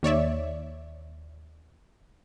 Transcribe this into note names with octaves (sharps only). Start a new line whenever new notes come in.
D#2 C#5 D5 E5